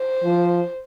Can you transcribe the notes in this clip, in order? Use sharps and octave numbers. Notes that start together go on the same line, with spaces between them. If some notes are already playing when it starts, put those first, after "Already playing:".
Already playing: C5
F3